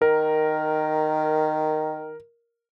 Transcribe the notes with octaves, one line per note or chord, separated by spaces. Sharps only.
D#3 A#4